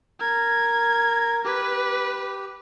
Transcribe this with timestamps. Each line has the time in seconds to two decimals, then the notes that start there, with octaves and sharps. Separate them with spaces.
0.21 A#4 G#6
1.45 G4 B4